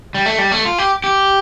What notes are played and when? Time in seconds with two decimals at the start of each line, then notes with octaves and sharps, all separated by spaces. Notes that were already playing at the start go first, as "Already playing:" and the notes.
0.15 G3
0.26 A3
0.39 G3
0.52 A3
0.65 F4
0.78 G4
1.04 G4